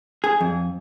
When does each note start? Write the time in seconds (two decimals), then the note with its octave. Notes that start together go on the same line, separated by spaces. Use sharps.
0.24 G#4
0.41 F2